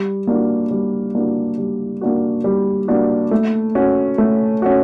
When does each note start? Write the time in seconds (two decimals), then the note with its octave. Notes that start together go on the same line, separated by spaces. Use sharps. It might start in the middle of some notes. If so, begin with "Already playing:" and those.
Already playing: G3
0.27 A#3 D4 F#4
0.71 G3
1.15 A#3 D4 F#4
1.58 G3
2.01 A#3 D4 F#4
2.44 G3
2.88 A#3 D4 F#4
3.31 A3
3.75 C#4 F#4
4.18 A3
4.62 C#4 F#4